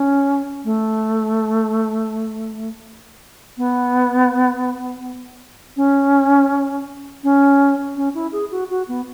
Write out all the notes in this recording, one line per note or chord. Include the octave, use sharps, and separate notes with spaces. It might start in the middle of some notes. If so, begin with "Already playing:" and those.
Already playing: C#4
A3
B3
C#4
C#4
C#4
E4
G#4
F#4
F#4
B3